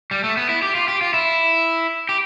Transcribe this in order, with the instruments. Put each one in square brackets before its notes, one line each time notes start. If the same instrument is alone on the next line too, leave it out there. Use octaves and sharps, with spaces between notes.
[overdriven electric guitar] G3
A3
B3
E4
G4
F4
G4
F4
E4
G4